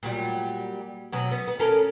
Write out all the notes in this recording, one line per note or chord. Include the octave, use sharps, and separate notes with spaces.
A#2 F#3 G3
B2 F#3 C#4
B3
B3
C#4 A4 A#4